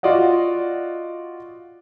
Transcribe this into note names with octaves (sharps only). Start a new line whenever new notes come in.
F4 F#4 D5 D#5 F#5